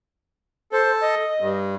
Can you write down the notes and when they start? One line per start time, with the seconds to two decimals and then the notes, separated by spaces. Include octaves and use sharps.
0.72 A4 C5
1.01 D#5
1.40 G2